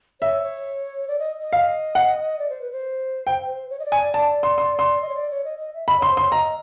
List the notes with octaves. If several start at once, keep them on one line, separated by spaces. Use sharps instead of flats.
C#5 E5
C#5
D5
D#5
D#5
F5
F#5
D5
C5
B4
C5
G5
C#5
D#5
D5
G#5
D5
D5 A5
C6
C6
C6
D#5
C#5
D5
C#5
D#5
D#5
E5
D#5 B5
C#5 C6
C5
C6
C#5
D#5 A#5